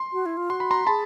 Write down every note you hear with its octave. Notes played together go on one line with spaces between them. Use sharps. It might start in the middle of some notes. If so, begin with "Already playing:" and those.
Already playing: C6
F#4
E4
F4
F#4 C6
B5
A#5 C6
G#4 A5 B5